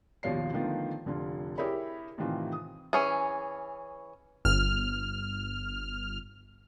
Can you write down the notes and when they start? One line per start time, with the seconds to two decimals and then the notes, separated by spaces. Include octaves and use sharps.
0.23 G#1 D#2 B2 F3 C#5 C7
0.53 D3 D#3 F3 A3 B3
1.06 F1 D3 F4
1.58 E4 G4 G#4 A#4 C#5 B5
2.18 A2 C3 D#3 E3 F4
2.52 D#6
2.93 E3 C#4 G#4
4.45 G1 F6